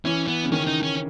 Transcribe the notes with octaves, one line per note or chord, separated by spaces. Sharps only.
E3 C#4
B3
C#3
D#3 C#4
D#4
C#4